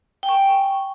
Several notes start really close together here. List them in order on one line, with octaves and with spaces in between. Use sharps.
G5 G#5 C#6